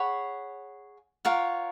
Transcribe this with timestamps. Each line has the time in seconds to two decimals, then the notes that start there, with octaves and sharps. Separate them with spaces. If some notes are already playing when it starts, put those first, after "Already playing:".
Already playing: G#4 C#5 F#5 B5
1.25 F4 A#4 C#5 F#5